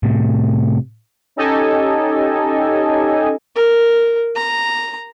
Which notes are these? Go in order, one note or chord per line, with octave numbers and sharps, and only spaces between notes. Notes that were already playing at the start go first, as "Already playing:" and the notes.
A2 C3
C#4 D#4 G4 A4 D#5 G#5
A#4
A#5